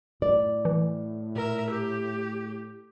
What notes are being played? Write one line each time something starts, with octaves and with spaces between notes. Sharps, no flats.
A2 D5
E3
A#2 A#4 E5
G4